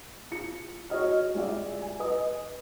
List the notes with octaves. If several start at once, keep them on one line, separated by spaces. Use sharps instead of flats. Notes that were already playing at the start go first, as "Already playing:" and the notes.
F4 C#7
F#4 C#5 D#5 F6
G3 G#3 F4 D5 E5
G#5
B4 D#5 D#6